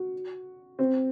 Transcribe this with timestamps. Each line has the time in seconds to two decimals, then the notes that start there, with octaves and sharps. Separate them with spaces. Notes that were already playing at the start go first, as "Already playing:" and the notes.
Already playing: F#4
0.79 C4